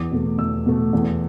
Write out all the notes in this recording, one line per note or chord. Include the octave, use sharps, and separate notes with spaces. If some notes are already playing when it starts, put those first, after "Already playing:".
Already playing: E2 D6
B2 A3
E2 E6
B2 A3
E2